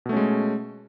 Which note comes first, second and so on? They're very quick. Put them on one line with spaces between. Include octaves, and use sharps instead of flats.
B2 A3 C#4 G#3